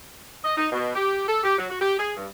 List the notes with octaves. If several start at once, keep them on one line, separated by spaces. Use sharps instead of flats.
D#5
D#4
B2
G4
A4
G4
F#3
F#4
G4
G#4
G2